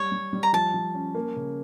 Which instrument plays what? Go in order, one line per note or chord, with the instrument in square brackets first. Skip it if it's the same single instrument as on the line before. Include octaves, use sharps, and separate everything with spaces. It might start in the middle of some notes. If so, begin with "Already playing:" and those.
Already playing: [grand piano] G3 [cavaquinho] C#5
[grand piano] G3
G3
[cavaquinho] A#5
[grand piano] F3 [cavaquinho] A5
[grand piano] F3
C#4
A#3
C#3